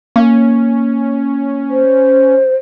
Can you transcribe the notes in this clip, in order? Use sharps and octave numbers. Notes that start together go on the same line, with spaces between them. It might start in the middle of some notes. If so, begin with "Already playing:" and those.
A#3 C#4
C5